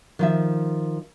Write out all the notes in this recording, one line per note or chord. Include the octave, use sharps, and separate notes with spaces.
D#3 F3 E5